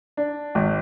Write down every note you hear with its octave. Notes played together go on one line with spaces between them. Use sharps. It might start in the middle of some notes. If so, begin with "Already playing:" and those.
D4
G#1